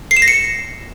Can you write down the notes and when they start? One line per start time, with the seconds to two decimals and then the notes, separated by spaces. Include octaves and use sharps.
0.11 C7
0.17 E7
0.22 A#6
0.28 C#7